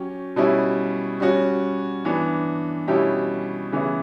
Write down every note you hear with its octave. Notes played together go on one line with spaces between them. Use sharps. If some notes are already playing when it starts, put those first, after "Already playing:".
Already playing: F#3 C#4 G4
B2 G3 C#4 E4
G3 C#4 F#4
E3 B3 D4
B2 G3 C#4 E4 G4
C#3 E3 B3 E4